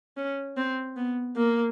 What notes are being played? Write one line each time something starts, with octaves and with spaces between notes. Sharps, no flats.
C#4
C4
B3
A#3